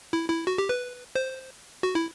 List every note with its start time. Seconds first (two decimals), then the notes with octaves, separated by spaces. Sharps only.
0.13 E4
0.29 E4
0.47 F#4
0.58 G4
0.69 B4
1.15 C5
1.83 F#4
1.95 E4